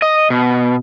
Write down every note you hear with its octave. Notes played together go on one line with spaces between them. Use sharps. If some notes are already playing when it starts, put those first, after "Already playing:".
D#5
B2